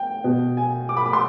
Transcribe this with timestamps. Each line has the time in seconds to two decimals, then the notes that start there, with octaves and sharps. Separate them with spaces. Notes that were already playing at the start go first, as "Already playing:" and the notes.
Already playing: G5
0.24 B2
0.57 G#5
0.89 D6
0.97 B5
1.06 D6
1.13 C6